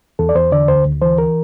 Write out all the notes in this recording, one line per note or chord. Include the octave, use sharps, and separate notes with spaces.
E2 A4
D5
E2 C5
D3 D5
D2 C5
D2
E3 C5
A#4